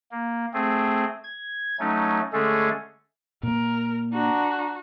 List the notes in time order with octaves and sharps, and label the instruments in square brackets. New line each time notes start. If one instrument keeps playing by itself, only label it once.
[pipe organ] A#3
A3 C4 G#4
G#6
F#3 A3 C#4 D#4
D3 G#3 A3 C#4 G#4 A4
[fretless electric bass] A#2 A#3 [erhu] A#4
[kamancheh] D4 A#5 [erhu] F#4